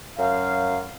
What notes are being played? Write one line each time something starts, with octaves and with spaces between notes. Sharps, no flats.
F#2 F5